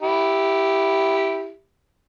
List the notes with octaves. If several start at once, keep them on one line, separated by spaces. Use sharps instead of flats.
E4 G4